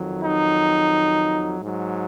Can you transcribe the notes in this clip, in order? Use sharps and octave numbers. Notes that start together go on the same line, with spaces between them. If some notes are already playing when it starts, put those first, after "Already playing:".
Already playing: F2 D#3 F#3
D#4
G#2 F#3